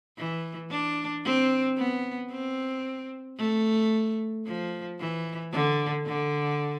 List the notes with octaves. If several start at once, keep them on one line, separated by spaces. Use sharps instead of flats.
E3
D4
C4
B3
C4
A3
F3
E3
D3
D3